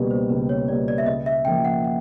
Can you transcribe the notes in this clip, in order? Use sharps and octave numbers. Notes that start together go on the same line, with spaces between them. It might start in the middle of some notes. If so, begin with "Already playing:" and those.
Already playing: C#2 B2 G3 A#3 G4 G#4 D5
C5
C#2 B4
C#5
B2 G3 A#3 D5
D5
E5
C#2 D#5
E5
C#3 F3 A#3 G5
F#5
F#5